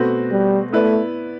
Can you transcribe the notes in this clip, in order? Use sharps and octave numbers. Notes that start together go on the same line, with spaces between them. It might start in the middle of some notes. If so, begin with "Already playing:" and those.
Already playing: B2 A3 C4 F#4 B4
G3
A3 B3 E4 B4 D5